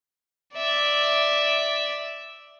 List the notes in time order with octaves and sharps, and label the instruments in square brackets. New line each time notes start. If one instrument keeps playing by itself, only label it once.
[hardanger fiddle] D5 E5